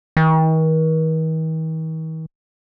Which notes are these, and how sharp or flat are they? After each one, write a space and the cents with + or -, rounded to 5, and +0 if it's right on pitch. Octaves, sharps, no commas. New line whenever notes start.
D#3 +45